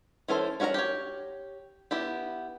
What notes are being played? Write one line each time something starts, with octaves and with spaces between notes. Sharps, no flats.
E3 C#4 A4 C5
C#4 F#4 A#4 E5 A#5
G4 C#5
B3 E4 G4